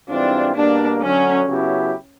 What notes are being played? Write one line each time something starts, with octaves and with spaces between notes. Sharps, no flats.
G#2 E3 G3 C4 D4 F4
B2 G3 A#3 D4
D2 D3 F#3 C#4
C#3 F#3 B3 E4 G4